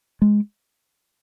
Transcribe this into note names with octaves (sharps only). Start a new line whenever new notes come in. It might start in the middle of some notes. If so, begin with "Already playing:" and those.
G#3